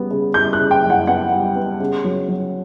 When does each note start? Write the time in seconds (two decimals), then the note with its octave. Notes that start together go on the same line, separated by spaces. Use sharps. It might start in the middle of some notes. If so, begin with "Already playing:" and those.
Already playing: C#3 G3 B3
0.11 C#3
0.34 G3 G6
0.53 F#6
0.59 C#3
0.71 G5
0.83 F#2
0.90 F#5
1.07 B3 F#5
1.32 G3
1.56 B3
1.80 C#3
2.04 F#3
2.28 F#3